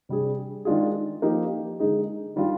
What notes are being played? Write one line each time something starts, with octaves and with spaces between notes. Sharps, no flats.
C3 G3 D4 G#4
D#3 G#3 D4 F4 G#4
F3 A#3 D#4 G4
D3 G#3 D#4 G#4
D#3 G3 D4 F4